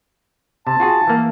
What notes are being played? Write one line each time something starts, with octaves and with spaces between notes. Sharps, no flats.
C3 A5
F4 F#4 G#4
E3 A#3